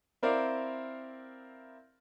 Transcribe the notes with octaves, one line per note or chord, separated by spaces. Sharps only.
C4 E4 A#4 C5 D5 F5